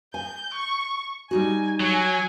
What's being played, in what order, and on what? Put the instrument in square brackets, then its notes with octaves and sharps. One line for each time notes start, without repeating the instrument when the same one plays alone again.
[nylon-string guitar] G#5 [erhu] G6
[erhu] C#6
[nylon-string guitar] G3 D#4 F#4 [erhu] G#5
[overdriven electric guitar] F#3 [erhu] G#5